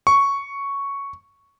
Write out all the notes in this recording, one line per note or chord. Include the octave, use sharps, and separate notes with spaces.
C#6